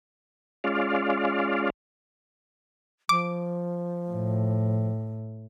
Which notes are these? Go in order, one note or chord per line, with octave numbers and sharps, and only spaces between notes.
G#3 C#4 F4 D5 F5
F3 D6
A2